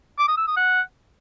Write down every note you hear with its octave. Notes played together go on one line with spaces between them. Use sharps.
D6
D#6
E6
D#6
F#5